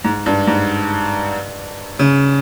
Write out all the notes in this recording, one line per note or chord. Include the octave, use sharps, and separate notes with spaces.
G#2
G2
G#2
C#3